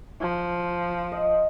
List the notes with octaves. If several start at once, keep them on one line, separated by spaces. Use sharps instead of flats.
F3
D#5